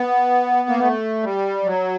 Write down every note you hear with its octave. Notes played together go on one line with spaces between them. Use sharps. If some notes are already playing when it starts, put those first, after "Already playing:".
Already playing: B3
A#3
A3
G3
F#3